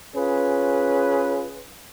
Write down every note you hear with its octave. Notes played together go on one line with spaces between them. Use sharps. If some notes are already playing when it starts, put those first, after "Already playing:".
C#4 F4 G#4 B4